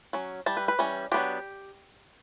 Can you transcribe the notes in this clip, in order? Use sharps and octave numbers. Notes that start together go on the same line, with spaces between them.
F#3 C#4
E3 G3 A5
B4
B4
E3 G3 C#4
F#3 B3 D4 G4